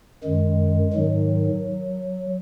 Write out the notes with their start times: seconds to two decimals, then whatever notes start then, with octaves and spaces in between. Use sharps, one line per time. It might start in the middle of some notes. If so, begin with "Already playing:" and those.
0.24 F#2 D#3 G#3
0.93 G#2 D#3 F#3